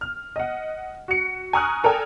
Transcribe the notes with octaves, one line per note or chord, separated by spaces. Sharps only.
F6
D#5 F#5
F#4 C#7
G#5 A#5 C#6 D#6 F6 F#6
A4 A#4 D5 G5 G#5 A#5